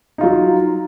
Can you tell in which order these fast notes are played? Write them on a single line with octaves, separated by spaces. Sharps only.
D#4 F4 F#3